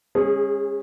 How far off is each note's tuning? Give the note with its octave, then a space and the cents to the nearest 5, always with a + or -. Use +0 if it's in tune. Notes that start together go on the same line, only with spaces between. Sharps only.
G#3 -40 C#4 -25 G#4 +0